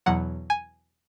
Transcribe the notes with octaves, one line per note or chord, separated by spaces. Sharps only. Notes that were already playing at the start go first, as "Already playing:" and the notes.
E2 B2 F#3 F#5
G#5